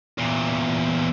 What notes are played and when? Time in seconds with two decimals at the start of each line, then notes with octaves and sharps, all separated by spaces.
0.18 E2 A#2